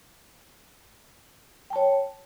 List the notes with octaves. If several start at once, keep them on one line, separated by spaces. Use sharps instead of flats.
C#5 G5 A5